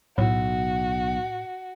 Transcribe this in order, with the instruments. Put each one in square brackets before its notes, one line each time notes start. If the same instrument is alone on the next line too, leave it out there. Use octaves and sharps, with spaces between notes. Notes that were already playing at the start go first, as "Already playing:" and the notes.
[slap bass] B1 [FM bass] A2 [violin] F#4